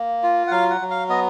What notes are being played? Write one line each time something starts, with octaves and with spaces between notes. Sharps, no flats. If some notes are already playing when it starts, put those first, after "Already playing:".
Already playing: A#3
F4
F#5
F#3 F5
F#5
F#3
F5
B3 D#5